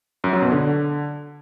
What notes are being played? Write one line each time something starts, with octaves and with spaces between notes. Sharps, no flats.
F#2
F#3
B2
D3